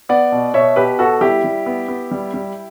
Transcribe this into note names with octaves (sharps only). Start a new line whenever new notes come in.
B3 D5 F#5
B2
B2 C#5 E5
B2 G4 B4
B3 F#4 A4
G3 E4 G4
G3
B3
B3
G3
G3